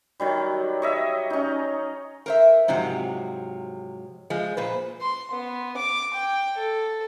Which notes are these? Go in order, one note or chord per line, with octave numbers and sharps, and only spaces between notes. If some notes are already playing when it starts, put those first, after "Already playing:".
D#3 F#3 G3
C#5 D#5 E5
C#4 D#4
A#4 C5 E5
G#2 C3 F3 F#3
F3 G#3
A#2 B4 C5
C6
B3
D6
G5
A4